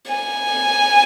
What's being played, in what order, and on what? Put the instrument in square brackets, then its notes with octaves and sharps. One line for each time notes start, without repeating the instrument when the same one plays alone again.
[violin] G#5